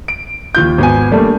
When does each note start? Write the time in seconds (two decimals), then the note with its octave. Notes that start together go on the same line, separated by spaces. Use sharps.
0.08 D7
0.55 D#2 F4 G6
0.78 G#1 B3 G#5
1.12 G3 A3 A#3 D4